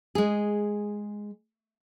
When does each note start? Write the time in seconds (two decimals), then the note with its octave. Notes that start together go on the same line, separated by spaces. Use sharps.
0.15 G#3 G#4